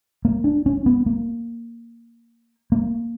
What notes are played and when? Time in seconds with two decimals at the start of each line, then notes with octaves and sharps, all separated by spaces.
0.25 A#3
0.44 D4
0.66 C#4
0.86 B3
1.06 A#3
2.72 A#3